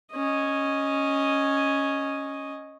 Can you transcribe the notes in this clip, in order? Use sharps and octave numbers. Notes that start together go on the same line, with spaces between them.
C#4 D#5